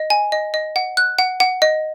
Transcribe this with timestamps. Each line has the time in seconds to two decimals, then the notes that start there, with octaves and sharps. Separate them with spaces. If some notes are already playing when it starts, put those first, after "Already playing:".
Already playing: D#5
0.10 G#5
0.32 D#5
0.54 D#5
0.76 F#5
0.97 F#6
1.19 F#5
1.40 F#5
1.62 D#5